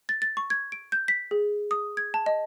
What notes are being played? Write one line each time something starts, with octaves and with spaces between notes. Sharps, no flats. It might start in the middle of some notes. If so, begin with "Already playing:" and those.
A6
A6
C#6
G#6
D7
G6
B6
G#4
D#6
G#6
A5
D#5